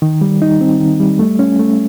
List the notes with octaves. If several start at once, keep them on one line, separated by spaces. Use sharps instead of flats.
D#3
G3
D#4
C4
D#3
G3
A3
C#4
A3